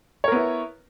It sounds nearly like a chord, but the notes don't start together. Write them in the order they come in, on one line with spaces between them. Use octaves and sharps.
C#5 A#4 B3 E4